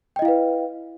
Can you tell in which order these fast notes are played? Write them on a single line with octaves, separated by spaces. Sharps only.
G5 D#5 E4 F5 B4